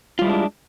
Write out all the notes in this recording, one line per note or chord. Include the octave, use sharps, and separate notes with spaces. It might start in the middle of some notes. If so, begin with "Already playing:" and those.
G3 G#3 D4 E4 F4